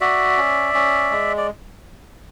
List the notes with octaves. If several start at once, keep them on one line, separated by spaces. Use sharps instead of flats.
F#4 D5 E5
C#4
C#4
G#3
D5